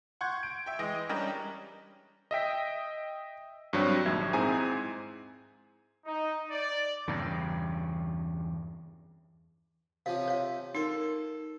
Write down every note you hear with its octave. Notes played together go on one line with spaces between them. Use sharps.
F#5 C6 C#6 G6 G#6
D7
E5 G5
E3 G#3 D#5
G3 C#4 D4 G4 A#4 D#5
D#5 E5 G5 B6
G2 F#3 G3 C4
A#1 D#2 E5 G#6
G#2 C4 E4 G#4 G#5 A#5
D#4
D5
E2 G2 C#3
C3 F3 C#4 F5
C#5 F5
D#4 A4 A#4